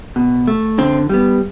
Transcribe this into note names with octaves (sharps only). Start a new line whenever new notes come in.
B2
A3
D3 C4
G3 B3